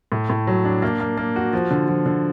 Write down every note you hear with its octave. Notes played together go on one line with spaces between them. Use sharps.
A2
A2
F#3
D4
A#3
A#3
A#3
F#4
F3
D3
F3
D3